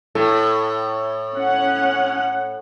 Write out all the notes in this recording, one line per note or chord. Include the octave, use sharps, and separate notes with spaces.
A2 A4
C#4 F#5